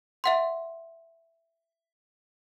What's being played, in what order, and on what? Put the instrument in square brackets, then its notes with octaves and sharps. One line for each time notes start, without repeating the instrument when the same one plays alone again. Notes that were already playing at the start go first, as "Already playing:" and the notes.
[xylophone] E5 F#5 C6